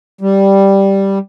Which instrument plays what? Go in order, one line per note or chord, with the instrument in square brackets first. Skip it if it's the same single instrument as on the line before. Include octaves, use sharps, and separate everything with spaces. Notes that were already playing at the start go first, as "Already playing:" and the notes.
[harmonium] G3